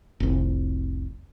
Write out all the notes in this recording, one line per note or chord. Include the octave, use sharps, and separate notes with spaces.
F1 C2